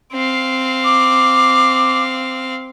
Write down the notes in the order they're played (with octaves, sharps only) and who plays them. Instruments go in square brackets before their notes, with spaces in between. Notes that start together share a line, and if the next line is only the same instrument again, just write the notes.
[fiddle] C4 F5
[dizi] D6